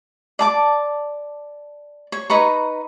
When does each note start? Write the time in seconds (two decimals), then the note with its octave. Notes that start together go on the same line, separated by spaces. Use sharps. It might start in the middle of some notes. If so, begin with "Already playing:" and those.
0.39 D5 A5 D6
2.12 C#5
2.30 D#4 B4 A#5 C#6